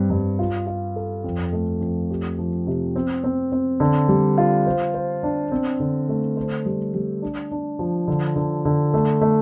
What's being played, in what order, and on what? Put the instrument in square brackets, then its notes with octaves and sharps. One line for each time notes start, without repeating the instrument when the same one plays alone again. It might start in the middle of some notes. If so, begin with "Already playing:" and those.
Already playing: [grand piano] G2 C4
G2
F4
F4
A4
F2
A3
F2
G4
F3
C3
C4
C4
C4
D3
G3
F4
C5
C5
D4
C4
D3
A3
C5
G3
G3
D4
D4
F3
D3
D3
D3
A3
A3